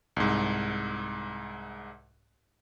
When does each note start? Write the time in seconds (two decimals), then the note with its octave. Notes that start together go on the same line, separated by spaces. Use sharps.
0.16 C2 G#2